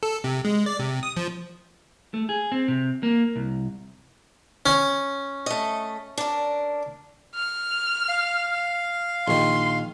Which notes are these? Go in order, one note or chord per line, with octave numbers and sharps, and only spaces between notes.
A4
C3
G#3
D5
C3
D#6
F3
A3
G#4
C4
C3
A#3
C2
C#4
A3 D#5
D4 A#4
F6
F5
A#1 D#3 C6